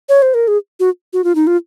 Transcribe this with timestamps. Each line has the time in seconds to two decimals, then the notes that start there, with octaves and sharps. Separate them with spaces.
0.09 C#5
0.22 C5
0.34 A#4
0.48 G#4
0.80 F#4
1.13 F#4
1.24 F4
1.35 D#4
1.47 F4